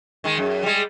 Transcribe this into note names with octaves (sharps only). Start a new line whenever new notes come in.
D#3 G#3
F#2
G3 G#3